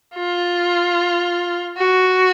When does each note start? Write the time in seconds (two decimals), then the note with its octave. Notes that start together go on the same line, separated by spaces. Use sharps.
0.15 F4
1.77 F#4